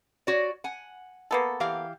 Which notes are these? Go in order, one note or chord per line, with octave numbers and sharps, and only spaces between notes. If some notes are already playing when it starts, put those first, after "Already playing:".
F#4 C#5 D5
F#5 G#5
A#3 B3 A4
E3 G4 F5